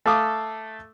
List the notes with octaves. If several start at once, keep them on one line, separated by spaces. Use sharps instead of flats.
A3 A4 F5 D6 D#6